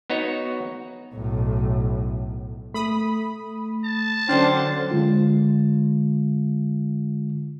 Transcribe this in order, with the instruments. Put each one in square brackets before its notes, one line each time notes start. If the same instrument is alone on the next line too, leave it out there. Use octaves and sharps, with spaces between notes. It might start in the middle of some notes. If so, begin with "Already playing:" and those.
[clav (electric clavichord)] B3 D#4 F#4 C#5
[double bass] B1 A2
[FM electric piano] A3 [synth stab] B5 D#6
[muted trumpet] A5
[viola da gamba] D3 F#3 C5 [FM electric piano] C#4 G5 F6 [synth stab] D4
[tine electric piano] D3 G#3 F4